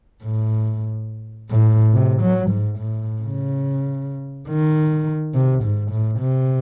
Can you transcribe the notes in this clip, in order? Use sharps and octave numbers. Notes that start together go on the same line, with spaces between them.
A2
A2
C3
F#3
G#2
A2
C#3
D#3
C3
G#2
A2
C3